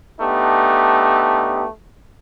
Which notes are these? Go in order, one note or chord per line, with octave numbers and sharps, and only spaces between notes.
A3 B3 D4 D#4 G4